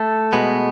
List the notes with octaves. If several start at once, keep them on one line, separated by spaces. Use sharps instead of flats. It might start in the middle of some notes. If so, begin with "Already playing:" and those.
Already playing: A3 A4
B2 G#3 B3